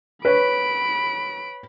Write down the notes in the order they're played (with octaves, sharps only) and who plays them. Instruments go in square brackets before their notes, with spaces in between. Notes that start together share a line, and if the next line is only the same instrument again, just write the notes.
[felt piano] B4 C#5 [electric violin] B5 D7